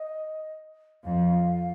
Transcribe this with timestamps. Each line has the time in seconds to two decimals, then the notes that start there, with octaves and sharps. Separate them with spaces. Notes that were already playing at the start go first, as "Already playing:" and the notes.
Already playing: D#5
1.04 F2 F5